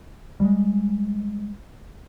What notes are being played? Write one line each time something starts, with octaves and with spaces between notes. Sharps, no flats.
G3 G#3